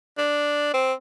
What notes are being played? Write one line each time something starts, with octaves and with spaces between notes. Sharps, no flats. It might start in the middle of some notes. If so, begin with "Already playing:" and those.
D4
C4